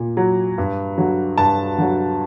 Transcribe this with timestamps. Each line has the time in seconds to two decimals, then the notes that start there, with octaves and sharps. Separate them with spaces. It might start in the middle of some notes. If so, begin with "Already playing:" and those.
Already playing: A#2
0.17 F#3
0.58 G2
0.98 D3 F#3
1.38 G2 A5
1.78 D3 F#3